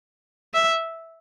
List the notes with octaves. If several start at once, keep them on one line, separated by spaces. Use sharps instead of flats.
E5